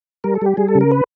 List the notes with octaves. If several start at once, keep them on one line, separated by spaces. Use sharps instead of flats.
G3 A#4
A4
G3 G4
G3 G#4
A4
C#3
A#4
B4